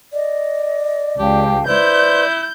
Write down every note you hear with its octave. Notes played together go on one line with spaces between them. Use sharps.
D5 D#5
C#2 G4 F5 G5 A5
E4 B4 C5 D5 C6 G6